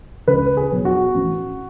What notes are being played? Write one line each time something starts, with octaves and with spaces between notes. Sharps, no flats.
C#2 B4
G#4
B2 F#3
F#4
A1